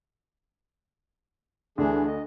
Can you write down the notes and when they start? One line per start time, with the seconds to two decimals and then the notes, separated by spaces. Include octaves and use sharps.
1.78 D2 E3 D4 G#4
2.07 D#5